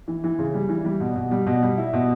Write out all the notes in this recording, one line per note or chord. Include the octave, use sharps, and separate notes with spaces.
E3
E3
C#3
G3
E3
G3
B2
B2
G3
B2
G3
E4
B2